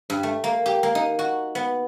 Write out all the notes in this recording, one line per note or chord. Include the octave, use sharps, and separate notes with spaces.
G2
A3
A#3
G4
A#3
D#4
F#4
B3